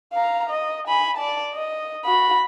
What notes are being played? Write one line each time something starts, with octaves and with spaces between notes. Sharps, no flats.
F5 A#5
D#5
G#5 B5
D5 A5
D#5
F#4 B5